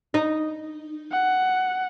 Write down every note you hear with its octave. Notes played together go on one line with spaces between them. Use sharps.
D#4
F#5